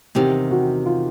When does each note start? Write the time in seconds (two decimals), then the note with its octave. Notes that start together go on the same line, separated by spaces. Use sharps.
0.15 E2 C3 D#3 G4
0.51 F#4
0.86 F4